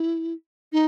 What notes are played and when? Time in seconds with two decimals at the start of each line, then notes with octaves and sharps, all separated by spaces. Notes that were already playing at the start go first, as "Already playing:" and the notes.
Already playing: E4
0.72 D#4